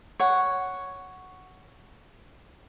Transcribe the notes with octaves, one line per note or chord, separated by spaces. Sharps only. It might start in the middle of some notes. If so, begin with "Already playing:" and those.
C#5 F#5